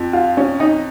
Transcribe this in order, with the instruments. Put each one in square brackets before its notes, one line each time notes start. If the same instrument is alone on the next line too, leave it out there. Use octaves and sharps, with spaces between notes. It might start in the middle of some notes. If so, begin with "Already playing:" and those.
Already playing: [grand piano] F2
[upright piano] F4
C#4
D#4